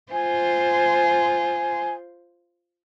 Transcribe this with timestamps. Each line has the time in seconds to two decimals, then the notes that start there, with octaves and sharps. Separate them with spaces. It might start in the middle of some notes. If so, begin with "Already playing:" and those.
0.12 F4 C5 G#5